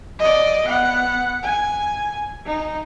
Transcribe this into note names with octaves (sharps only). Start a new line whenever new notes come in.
D5 D#5
B3 F#5
G#5
D#4